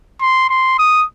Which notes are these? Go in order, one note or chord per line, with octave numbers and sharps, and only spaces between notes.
C6
C6
D#6